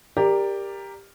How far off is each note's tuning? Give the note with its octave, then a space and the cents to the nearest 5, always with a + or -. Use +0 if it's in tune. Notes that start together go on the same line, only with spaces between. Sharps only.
G4 +15 A#4 +0 D5 +0